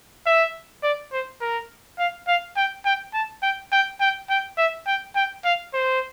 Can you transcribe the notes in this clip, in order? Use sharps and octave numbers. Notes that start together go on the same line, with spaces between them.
E5
D5
C5
A#4
F5
F5
G5
G5
A5
G5
G5
G5
G5
E5
G5
G5
F5
C5